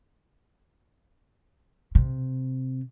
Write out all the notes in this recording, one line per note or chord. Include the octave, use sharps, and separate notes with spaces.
C3